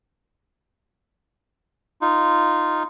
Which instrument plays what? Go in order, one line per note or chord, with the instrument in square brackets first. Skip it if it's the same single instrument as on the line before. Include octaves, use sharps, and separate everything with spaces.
[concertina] D#4 F4